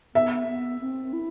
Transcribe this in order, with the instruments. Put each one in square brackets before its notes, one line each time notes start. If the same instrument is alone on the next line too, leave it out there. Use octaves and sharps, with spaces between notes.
[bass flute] B3 [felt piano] E5
[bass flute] B3
C4
E4